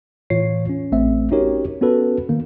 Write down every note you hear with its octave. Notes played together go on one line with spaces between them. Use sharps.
A2 E3 F4 C#5 C7
C#4
A1 A3 C4 E5
C#4 D#4 F#4 G4 A#4 C#5
B3 C#4 F#4 A4 B4
D#3 A#3